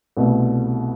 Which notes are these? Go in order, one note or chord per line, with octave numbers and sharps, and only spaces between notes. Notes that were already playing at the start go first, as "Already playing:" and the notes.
C2 B2 A3